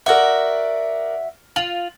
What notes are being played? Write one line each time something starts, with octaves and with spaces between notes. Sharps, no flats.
F#4 A#4 D5 E5 F#5
F4 F#7